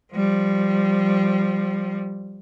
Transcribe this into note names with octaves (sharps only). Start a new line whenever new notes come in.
F3 G3